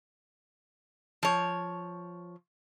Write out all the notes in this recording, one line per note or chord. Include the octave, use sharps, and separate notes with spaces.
F3 C#5